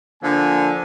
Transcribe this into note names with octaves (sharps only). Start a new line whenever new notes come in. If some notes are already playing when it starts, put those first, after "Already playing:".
D3 F3 A#3 D4 G#5